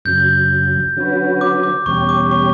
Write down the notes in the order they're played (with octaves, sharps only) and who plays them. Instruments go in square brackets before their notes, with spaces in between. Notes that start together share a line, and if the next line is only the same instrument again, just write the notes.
[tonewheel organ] F#2 C#3 F#3 [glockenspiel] G6
[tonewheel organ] D3 F#3 C#4 F#4 B4
[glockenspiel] D6
D6
[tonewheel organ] E2 B2 G3 C#4 G4 [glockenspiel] C#6
[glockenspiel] D6
C#6